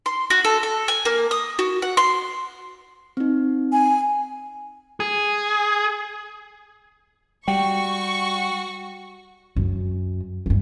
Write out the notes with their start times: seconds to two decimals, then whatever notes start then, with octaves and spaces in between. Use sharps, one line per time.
0.06 C6
0.30 F#4
0.44 A4
0.63 A4
0.88 G#5
1.05 A#3
1.31 D#6
1.59 F#4
1.82 F#5
1.97 C6
3.17 C4 D#4
3.72 G#5
5.00 G#4
7.48 G3 F#4 G5 C#6
9.56 F#2
10.46 G2 E3